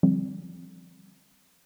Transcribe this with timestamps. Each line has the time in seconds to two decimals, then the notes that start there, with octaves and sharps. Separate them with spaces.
0.03 D3 F3 G3 C4